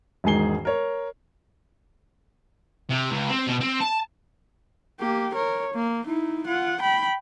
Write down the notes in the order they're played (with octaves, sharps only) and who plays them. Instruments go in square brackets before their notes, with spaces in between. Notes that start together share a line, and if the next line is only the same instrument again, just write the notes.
[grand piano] E1 G#2 D#3 G#4 C7 G7
A#4 C#5
[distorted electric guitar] C3
C#2
C4
B2
C4
A5
[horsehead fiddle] A#3 G4
A#4 C#5
A#3
D#4 E4
F4 F#5
G5 B5